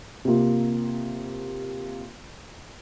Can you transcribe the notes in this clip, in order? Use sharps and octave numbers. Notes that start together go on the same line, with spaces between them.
C3 A#3 F4